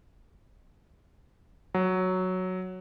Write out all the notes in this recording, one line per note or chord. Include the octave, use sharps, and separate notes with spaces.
F#3